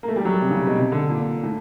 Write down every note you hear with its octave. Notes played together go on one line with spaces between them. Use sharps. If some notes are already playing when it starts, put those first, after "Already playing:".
A#3
A3
G3
F#3
C3
C#3
C3
B2
C3
D3
A#2
A2